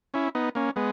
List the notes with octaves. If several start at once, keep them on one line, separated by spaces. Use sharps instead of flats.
C#4 E4
B3 D#4
A#3 C#4
G#3 B3